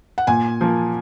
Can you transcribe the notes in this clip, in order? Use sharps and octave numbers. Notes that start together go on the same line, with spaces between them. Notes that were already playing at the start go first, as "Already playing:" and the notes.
F#5
A#2 G#5
F3 A#3